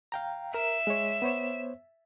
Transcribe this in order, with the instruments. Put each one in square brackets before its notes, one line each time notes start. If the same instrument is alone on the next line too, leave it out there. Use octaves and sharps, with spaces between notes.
[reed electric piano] F5 G5 A#5
[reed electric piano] A#4 A#5 [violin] E5 E7
[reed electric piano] G#3 C#5
B3 C5 C#5